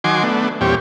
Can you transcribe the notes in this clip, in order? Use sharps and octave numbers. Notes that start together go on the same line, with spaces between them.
D#3 F#3 G#5 C6 D6
A3 B3 D4
E2 A#2 G3 C4 G4 C#5